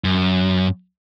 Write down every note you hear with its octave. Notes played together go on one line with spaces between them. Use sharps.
F#2